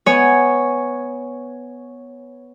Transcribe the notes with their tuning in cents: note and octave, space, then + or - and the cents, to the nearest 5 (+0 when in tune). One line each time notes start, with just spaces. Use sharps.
B3 +0 C#5 +0 G#5 +0